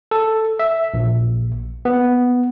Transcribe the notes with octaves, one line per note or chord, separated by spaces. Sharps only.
A4
E5
A#1
B3